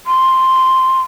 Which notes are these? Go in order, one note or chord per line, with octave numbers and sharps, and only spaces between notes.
C6